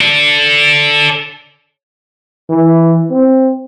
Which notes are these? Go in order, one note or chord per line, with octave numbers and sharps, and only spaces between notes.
A4 D5
E3
C4